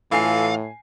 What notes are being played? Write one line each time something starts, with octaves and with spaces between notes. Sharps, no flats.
A2 E3 F4 A4 F5 G#5 C7